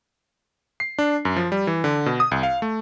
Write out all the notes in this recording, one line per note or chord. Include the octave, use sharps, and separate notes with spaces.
C7
D4
F#2
F3
G3
E3
D3
B2
D#6
C2
F5
A3